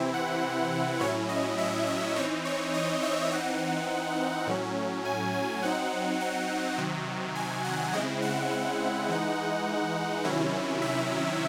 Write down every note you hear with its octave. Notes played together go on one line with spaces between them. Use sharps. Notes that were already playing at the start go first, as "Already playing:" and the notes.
Already playing: C3 E3 C4 E4
F#5
A2 F#3 C#4 E4 C#5
D#5
E5
E5
E3 C4 D#4 C#5
C#5
D#5
E5
E3 C4 D#4 F#5
A2 F#3 C#4
G#5
G#5
F#3 C4 D#4 F#5
F#5
C3 D#3 F#3
G#5
F#5
C#3 G#3 C4 E4 D#5
F#5
F#5
E3 G#3 D#4
C3 D#3 F#3 C#4 E4
E5